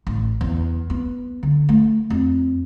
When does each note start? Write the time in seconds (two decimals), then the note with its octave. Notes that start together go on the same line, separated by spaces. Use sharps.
0.07 A1
0.41 E2
0.90 B3
1.43 D3
1.69 A3
2.10 F2